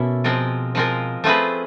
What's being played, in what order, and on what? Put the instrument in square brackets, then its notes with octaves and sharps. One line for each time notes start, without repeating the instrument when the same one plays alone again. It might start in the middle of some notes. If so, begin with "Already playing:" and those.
Already playing: [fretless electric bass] B2 [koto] A#3 C#4 E4 A4
[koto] F3 G#3 C4 F4 A#4
F3 G#3 C4 F4 A#4
A3 C4 F4 G#4 B4